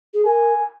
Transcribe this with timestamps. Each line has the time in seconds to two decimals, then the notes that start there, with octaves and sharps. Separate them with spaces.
0.14 G#4
0.25 A#4 G#5